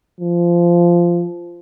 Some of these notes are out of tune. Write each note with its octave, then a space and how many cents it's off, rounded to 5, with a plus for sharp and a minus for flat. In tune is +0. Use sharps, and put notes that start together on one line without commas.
F3 -15